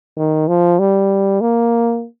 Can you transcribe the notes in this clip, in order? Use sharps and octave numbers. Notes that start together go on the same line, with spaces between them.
D#3
F3
G3
A#3